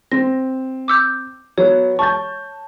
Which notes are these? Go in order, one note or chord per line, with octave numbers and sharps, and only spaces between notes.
C4 A#6
D6 E6 G6
F#3 B3 C#5
A5 C#6 G6 A6